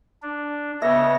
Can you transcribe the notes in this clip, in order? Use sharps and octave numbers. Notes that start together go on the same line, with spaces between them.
D4
C#3 B3 C#5 E5 A#6